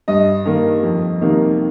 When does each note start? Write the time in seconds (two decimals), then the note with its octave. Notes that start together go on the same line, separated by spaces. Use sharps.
0.08 G2 D#5
0.46 D#3 A#3
0.83 F2
1.21 C3 D#3 A#3 D#4